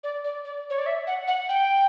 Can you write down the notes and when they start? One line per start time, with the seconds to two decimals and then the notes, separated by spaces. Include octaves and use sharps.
0.03 D5
0.24 D5
0.45 D5
0.70 C#5
0.78 D5
0.86 E5
1.07 F#5
1.27 F#5
1.49 G5